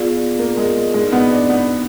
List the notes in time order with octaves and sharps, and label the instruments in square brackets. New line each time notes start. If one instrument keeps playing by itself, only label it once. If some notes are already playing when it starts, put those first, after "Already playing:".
Already playing: [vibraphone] B3 F4 G#4 D5 F5
[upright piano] A#3
G#3
[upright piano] G#3 [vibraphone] D#4 F#4 D5
[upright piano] B3
D4
B3